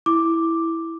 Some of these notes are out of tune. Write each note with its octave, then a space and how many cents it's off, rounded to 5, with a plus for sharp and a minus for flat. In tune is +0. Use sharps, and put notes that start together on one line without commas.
E4 +0 D6 +0